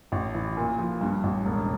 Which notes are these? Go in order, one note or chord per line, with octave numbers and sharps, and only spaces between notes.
A1
E3
A#2
F3
G2
A1
E1